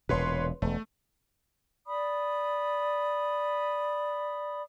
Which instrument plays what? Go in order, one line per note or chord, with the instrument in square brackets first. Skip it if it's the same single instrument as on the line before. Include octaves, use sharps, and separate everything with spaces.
[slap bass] E1 A#2 [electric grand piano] B4 C#5 C6
[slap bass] E1 [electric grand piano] A3
[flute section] D5 B5 D#6